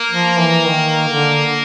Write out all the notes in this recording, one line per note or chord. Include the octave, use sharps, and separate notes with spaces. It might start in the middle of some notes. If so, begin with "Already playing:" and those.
Already playing: A#3
F3
E3
D#3
D3